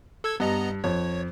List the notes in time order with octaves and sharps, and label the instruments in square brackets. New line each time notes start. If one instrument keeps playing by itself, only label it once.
[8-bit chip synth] A4 E6 G#6
[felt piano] G2 [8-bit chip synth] B3 D#5 A#5
[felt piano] F2 [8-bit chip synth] C#5